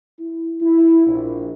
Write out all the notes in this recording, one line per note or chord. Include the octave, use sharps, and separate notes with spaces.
E4
E4
A#1